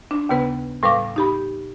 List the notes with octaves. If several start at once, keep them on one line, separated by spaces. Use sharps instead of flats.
D4
D#2 C#3 B3 B4
A2 G3 B4 F5 D6
D#4 G4 B5